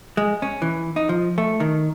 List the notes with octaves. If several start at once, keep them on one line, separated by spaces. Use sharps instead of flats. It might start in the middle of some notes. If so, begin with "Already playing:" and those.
G#3
C#4
E3
D#4
F3
A3
D#3